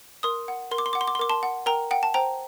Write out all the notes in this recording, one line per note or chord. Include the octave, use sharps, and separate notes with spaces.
A#4 C6 D#6
F#5
A#4 C6
D6
C6
F#5 D6
C6
D6
C6
A#4 D6
A5 C6
F#5
A#4 G5 A#5
F#5 G5
A5
C5 G5 A#5